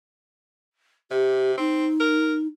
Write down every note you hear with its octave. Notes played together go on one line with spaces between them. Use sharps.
C3 G4
C4 D#4
A#4